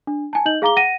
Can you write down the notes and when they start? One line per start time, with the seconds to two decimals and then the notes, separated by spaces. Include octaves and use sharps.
0.07 D4
0.33 G#5 A5
0.45 D#4 D#5 G6 F#7
0.62 G#4 F5 A#5 D6 G7
0.76 F#5 A#6 D#7